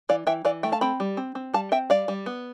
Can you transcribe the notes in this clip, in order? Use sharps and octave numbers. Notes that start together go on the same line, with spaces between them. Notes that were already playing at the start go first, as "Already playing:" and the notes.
E3 D5 F5
E3 E5 G5
E3 D5 F5
A3 E5 G5
F5 A5
C4 G5 B5
G3
C4
C4
G3 F5 A5
C4 E5 G5
G3 D5 F5
G3
B3